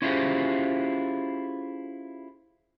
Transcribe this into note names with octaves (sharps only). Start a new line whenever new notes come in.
C#4 E4 F4 G4 G#4 C5